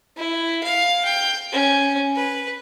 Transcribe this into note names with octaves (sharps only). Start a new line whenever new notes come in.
E4
F5
G5
C#4
B4